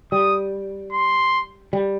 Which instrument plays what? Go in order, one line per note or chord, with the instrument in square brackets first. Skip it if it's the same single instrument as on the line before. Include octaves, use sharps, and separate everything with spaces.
[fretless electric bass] G3 [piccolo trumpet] D#6
[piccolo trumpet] C6
[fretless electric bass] G3